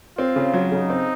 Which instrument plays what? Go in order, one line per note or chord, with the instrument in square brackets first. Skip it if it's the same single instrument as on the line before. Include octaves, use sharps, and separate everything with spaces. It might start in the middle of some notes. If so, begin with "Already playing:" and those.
[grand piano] C4 [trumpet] F4
[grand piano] C#3
F#3
[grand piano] C#3 [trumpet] D#4
[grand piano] C4